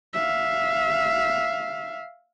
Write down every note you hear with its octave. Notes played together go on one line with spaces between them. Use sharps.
E5 F5